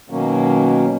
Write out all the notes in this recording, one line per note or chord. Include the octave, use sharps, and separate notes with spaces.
B2 D#3 F#3 A#3 C#4